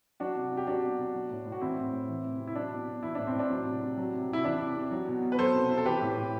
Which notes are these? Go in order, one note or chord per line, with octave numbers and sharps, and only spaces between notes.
F#3 D4 F#4
C3
C3
G4
F#3 D4 F#4
B2
B2
F#3
A2
A2
F#4
E3 C4 E4
A2
A2
E3
C3
C3
E4
F#3 D4
B2
B2
E3 E4
A2 D4
C4
A2 D4
F#3
C3
C3
F#3
C3
C3 E4
E3 D4
C3
C3
F#3
B2
B2
B4
F#3 A4 C5
C3
C3
A4
E3 G4 B4
A2
A2